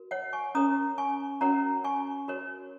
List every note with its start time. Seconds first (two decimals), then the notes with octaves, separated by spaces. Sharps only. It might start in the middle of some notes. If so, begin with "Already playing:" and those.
Already playing: F#4 A#4
0.11 C#5 F#5
0.33 G#5 C#6
0.55 C#4 A#4 C#5 A#5 D#6
0.98 G#5 C#6
1.41 C#4 F#4 A#4 C#5 F#5 A#5
1.84 G#5 C#6
2.28 F#4 A#4 C#5